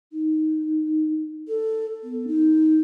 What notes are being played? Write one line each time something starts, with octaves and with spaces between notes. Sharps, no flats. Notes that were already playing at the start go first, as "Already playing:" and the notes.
D#4
A4
B3
D#4